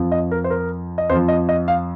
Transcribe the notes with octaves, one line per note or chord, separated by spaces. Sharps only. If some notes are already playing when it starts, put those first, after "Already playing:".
Already playing: F2 F3
D#5
A#4
C5
A#4
D#5
F2 F3 C5
D#5
D#5
F5